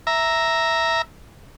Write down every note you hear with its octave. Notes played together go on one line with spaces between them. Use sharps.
E5 A#5